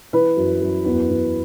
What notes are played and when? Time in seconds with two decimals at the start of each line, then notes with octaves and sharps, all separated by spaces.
0.13 E3 B4
0.37 F#2
0.61 F#2
0.86 E2
1.09 E2